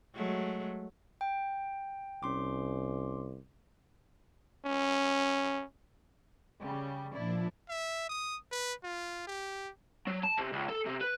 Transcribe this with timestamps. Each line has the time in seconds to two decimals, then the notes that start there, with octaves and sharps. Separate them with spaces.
0.15 F#3 G#3 A3
1.21 G5
2.23 C2 C#4 C6 D6
4.65 C#4
6.61 C#3 G3
7.14 A#2 F3 D4 E4 D5
7.69 E5
8.09 D#6
8.52 B4
8.84 F4
9.27 G4
10.07 F#3
10.24 A5
10.38 C3
10.53 C#2
10.69 A4
10.86 C3
11.01 B4